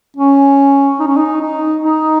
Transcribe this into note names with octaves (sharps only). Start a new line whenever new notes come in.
C#4
D#4
C#4
D#4
D#4
D#4